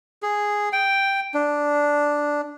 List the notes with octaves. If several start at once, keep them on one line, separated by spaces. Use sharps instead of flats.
G#4
G5
D4